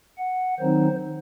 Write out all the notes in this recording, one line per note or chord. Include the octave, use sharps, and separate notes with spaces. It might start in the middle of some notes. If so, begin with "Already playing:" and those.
F#5
D#3 F#3 C4 D#4 C5